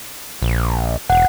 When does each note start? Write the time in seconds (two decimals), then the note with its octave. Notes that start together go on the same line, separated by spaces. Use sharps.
0.42 A#1
1.10 E1 F#5